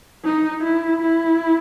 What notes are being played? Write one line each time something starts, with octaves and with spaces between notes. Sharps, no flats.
D#4
E4
E4